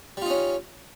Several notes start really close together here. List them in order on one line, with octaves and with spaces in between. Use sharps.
G3 F4 D#4 C#4